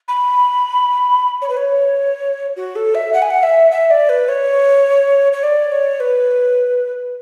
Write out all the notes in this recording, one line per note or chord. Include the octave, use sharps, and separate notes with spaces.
B5
C#5
B4
C#5
F#4
A4
E5
F#5
G#5
F#5
E5
E5
D5
B4
C#5
C#5
D5
C#5
B4